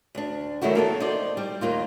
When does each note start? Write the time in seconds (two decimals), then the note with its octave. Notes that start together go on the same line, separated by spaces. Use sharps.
0.15 D2 D4
0.61 D#3 F#3 A3 D#4 E4 F#4
0.75 A#3 B3 A4
1.00 D#4 C5 D5
1.37 G3
1.61 D#2 A#3 D#4 F4